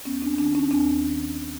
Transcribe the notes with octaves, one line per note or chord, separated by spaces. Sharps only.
D#2 B3 C#4
C4 D4
D#3 C4 D4
C#4 D#4
D#2 C4 D4
D#3